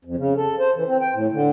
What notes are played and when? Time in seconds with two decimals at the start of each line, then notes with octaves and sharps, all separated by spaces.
0.05 F2
0.17 C#3
0.37 A4
0.60 C5
0.76 E3
0.89 C4
1.02 G5
1.14 A2
1.32 D3